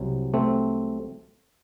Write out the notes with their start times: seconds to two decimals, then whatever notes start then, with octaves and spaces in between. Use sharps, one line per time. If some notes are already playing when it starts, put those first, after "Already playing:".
Already playing: C2 C3 F#3
0.34 A3 C4